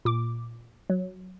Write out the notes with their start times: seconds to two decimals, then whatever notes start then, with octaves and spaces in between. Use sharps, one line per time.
0.05 A#2 D6
0.90 F#3